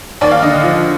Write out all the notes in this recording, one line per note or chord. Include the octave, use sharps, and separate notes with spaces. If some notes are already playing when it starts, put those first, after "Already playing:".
D#2 D5
F5
D3 D#5
F3